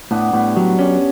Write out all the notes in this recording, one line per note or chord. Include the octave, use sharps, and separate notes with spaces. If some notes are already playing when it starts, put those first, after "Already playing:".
A2 B3 D4
A2 G3 B3
F#3 G3
G3 C#4